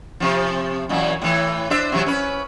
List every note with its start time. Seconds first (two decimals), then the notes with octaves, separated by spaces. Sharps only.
0.20 C3 F3
0.89 F#2 A#2 E3
1.22 A2 E3
1.70 D4 C5 E5
1.92 C3 E3 F#3
2.06 C#4 B4